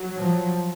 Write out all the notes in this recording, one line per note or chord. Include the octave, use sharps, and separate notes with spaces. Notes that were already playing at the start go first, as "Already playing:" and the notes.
Already playing: F#3
F3